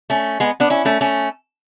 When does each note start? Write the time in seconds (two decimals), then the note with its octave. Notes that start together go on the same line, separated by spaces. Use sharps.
0.10 A3 C#4
0.40 G#3 B3
0.60 B3 D4
0.70 C#4 E4
0.85 A3 C#4
1.01 A3 C#4